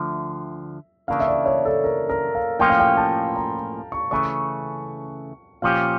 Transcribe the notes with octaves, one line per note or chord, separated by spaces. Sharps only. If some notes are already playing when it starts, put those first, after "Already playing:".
Already playing: D2 D3 F3 E5
C#3 E3 A#3 D4 F5
E5
D5
C#5
A4
A#4
A#4
F5
A2 F3 A#3 C#4 F4 G5
F5
G5
A5
A#5
C#6
C#3 E3 A3 C#4 C#6
A#2 F3 C#4 G4 F5